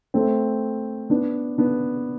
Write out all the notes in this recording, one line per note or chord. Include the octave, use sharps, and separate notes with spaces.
A3 C4
B3 D4
B3 D4